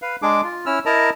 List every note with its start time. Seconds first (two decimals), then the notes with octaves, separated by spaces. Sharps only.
0.02 B4 F5
0.22 G#3 D4 G#4 D6
0.44 F4
0.66 C#4 E4 E6 F6
0.86 E4 A#4 D#5 A5 A#5